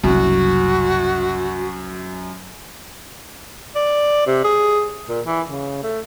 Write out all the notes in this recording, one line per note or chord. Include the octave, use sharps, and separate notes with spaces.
F#1 C2 F#2 F#4
D5
C3
G#4
A#2
E3
C#3
A3